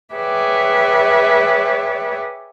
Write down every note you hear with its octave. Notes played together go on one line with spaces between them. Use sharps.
G#4 B4 C#5 D5 E5 G5